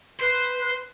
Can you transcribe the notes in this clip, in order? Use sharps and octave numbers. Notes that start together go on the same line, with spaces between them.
B4 C5